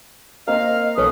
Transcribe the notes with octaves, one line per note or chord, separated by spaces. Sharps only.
A#3 C4 C5 D#5 F5
B1 C#4 A4 B4 D#6